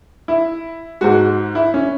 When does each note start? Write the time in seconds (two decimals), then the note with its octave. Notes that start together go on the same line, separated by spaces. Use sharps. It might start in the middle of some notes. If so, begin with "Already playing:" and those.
0.28 E4
1.01 G#2 G#3 F#4
1.55 E4
1.74 C#4